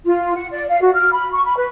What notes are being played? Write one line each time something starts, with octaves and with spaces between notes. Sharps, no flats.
F4
F#5
D5
F5
F#4
F6
B5
C#6
B5
B4